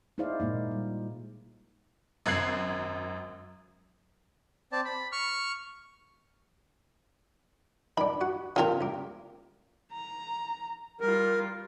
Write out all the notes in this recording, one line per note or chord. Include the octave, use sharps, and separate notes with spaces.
D#4 E4 G#4 C5 D5 F5
A#2 G#3 A#3 D#4
G3
G#1 F#2 F#6 G#6 C7 F#7
C4 D5 A5
B5
C#6 F6
D#3 D4 B5
F#4 F#5
E2 C#3 F4 G4 A#4
C#2 A#3
A#5
G3 F4 A#4